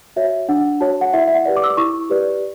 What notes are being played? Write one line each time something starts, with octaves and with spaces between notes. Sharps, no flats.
F#4 C#5 E5
D4 F#5
F#4 C#5 A5
F#5
E4 E5
E5
F#5
G4 B4 D5
D6
E6
D6
E4 C#6
G4 B4 D5